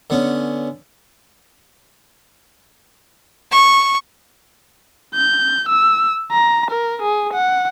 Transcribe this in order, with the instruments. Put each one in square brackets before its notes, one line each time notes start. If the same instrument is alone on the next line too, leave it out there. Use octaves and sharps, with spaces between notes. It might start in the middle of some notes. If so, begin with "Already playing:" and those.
[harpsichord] D3 B3 C#4
[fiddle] C#6
[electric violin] G6
E6
A#5
A#4
G#4
F#5